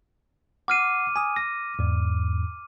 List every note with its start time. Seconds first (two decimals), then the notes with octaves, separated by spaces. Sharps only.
0.68 F#5 D6 F6 C7 D#7
1.16 G#5 D#6
1.36 A#6
1.79 E2 G#2